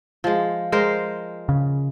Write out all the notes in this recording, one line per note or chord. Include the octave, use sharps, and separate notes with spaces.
F3 G#3
G#3 A#4 C5
C#3